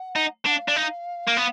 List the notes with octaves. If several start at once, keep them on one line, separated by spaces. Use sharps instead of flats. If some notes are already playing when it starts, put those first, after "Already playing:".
Already playing: F#5
D#4
D4 F#5
F5
D4
D#4
A#3
B3